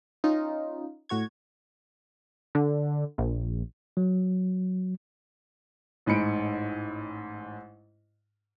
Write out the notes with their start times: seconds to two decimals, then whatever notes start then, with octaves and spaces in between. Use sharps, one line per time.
0.24 C#4 D#4 F4
1.09 A2 F#4 C#5 G#6
2.55 D3
3.18 A#1
3.97 F#3
6.06 A1 G#2 B5 C#7 D7